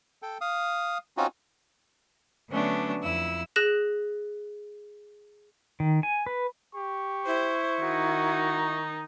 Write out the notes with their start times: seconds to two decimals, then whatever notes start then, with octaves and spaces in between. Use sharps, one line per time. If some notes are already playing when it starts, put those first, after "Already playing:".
0.22 A4 G5
0.41 F5 D#6
1.17 C4 C#4 D#4 F4 F#4
2.50 D3 F#3 A3 B3 C#4 D4
3.02 F2 E4 E6
3.56 G#4 F#6 A#6 E7
5.80 D#3
6.03 G#5
6.26 B4
6.75 G4 C#6
7.27 E4 C5
7.82 D#3 D#4 F#4